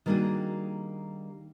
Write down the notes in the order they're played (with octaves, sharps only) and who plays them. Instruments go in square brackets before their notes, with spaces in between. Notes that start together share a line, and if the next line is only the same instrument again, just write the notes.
[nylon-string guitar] D#3 G3 A#3 D4 F#4 G#4